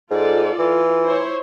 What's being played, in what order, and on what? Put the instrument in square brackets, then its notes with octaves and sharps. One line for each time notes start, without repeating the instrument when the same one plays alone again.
[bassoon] G#2 [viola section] F4 A4 D5
[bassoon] E3 [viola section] F4
[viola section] E4 C5 C#5